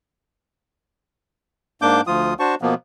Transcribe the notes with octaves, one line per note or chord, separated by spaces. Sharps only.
G#2 A#3 D4 D6 G6
D2 F3 F4 D#6
D4 F#4 C5 A5 C#6
B2 F3 A#3 B3